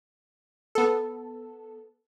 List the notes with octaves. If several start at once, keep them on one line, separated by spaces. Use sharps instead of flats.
B3 A4